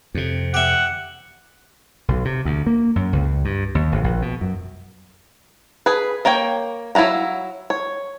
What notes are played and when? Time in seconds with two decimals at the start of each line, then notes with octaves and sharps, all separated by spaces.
0.15 F2 C3
0.54 G4 E5 F#5
2.08 B1
2.25 C3
2.45 D2
2.67 A#3
2.96 F#2
3.13 C#2
3.45 G2
3.75 D#2
3.92 G#1
4.04 A#1
4.22 B2
4.41 F#2
5.86 G#4 B4
6.25 A#3 A#4 C#5 G5
6.95 F#3 E4 F5 F#5 A#5
7.70 C#5